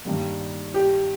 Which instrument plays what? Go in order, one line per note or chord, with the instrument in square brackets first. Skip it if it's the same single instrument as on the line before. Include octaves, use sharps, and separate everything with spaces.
[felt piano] G2 D#3 G3 A#3
[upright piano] G4